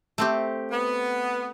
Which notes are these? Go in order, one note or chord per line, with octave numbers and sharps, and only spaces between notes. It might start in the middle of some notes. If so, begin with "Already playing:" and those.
A3 C4 G4
B3